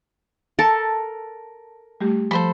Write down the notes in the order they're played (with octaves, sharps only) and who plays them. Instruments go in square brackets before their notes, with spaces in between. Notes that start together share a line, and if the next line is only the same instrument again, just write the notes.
[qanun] A4 [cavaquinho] A#4 A5
[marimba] G3 A3 G4
[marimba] F3 [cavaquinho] A4 C5 B5